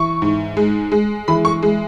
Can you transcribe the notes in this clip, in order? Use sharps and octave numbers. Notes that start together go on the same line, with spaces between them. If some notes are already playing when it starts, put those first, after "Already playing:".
Already playing: E3 C#6
G#2
G#3
G#3
E3 B5
C#6
G#3